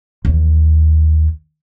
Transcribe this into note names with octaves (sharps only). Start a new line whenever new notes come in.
D#2 E3